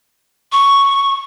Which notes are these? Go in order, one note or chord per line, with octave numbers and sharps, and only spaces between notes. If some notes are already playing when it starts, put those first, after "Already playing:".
C#6